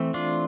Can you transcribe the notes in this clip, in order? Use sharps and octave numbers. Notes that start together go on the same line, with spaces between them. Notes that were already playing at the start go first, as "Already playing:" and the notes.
Already playing: E3 A3 C4
D4 F4